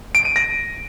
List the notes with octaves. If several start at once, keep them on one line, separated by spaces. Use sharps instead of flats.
D7
D#7
A#6